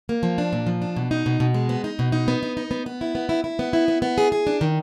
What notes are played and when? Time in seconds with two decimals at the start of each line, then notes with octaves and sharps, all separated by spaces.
0.09 A#3
0.23 F3
0.38 D4
0.53 A#2
0.67 F3
0.82 D4
0.97 B2
1.11 D#4
1.26 B2
1.40 B2
1.54 G#3
1.69 B3
1.84 D#4
1.99 B2
2.12 D#4
2.28 B3
2.43 D#4
2.57 D#4
2.71 B3
2.86 B3
3.01 E4
3.15 B3
3.29 E4
3.44 E4
3.59 B3
3.73 E4
3.88 B3
4.02 B3
4.18 G#4
4.32 G#4
4.47 D4
4.61 D#3